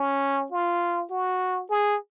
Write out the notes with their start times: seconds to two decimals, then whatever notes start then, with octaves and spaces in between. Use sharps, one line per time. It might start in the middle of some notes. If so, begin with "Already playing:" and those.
Already playing: C#4
0.52 F4
1.10 F#4
1.70 G#4